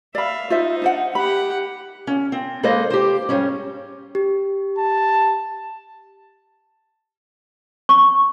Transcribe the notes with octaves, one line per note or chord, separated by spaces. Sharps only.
D5 E5 F5 B5
D#4 F4 C5 E5
D4 C5 F#5
G4 F#5 B5
C#4
C4
G#3 A#3 A4 B4 C5 D#5
G4 C5
G#2 G3 C#4
G4
A5
C#6